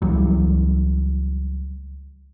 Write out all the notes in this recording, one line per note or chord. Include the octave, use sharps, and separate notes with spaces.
C#2 E3 F#3 G3